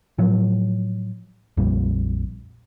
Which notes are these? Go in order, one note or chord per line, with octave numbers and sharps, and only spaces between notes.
A2 F3 F#3
A#1 F2 A#2 G3